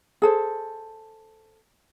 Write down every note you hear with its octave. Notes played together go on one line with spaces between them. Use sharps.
G#4 A4 C5